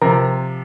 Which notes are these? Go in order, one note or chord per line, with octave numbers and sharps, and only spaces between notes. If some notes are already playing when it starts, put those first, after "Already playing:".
C3 F3 A#4